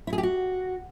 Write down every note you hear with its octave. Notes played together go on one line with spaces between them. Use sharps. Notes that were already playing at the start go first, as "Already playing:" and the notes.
E4
G#4
G4
F#4